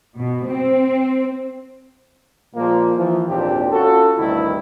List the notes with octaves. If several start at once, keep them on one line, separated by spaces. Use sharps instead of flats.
B2
C4
A#2 F3 G#3 A#3
E3 F3
G#1 D#2 A#2 C4 D4 G4
C#4 F4 F#4 A4
D2 G2 C3 D#3 E4